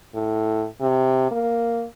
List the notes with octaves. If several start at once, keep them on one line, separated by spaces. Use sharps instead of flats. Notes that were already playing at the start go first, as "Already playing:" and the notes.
A2
C3
A#3